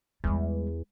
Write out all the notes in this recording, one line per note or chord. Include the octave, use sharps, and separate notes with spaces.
E2 G3 G#3